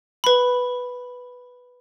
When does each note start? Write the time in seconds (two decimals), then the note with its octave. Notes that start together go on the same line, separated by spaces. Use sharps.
0.24 B4 B5